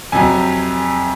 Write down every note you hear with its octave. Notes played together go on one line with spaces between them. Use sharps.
F2 C3 F#3 G#5